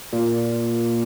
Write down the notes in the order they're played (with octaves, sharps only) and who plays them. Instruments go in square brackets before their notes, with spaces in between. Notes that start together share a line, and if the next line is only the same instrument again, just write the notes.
[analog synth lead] A#2